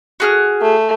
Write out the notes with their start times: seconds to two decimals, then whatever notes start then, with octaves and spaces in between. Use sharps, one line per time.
0.20 F#4 G#4 F6
0.62 A3